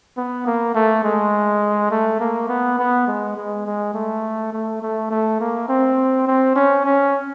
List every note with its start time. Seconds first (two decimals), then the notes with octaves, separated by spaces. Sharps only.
0.17 B3
0.46 A#3
0.75 A3
1.04 G#3
1.91 A3
2.20 A#3
2.49 B3
2.79 B3
3.07 G#3
3.36 G#3
3.66 G#3
3.94 A3
4.52 A3
4.82 A3
5.11 A3
5.40 A#3
5.68 C4
6.27 C4
6.56 C#4
6.85 C#4